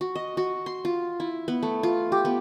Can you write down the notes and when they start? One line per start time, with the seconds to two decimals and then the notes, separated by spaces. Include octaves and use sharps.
0.01 F#4
0.16 D#5
0.37 F#4
0.66 C6
0.85 F4
1.20 E4
1.48 B3
1.63 A3
1.83 F4
2.12 G4
2.25 B3